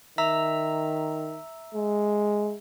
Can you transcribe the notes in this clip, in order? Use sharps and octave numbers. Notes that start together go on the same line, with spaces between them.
D#3 E5 A#5 E6
G#3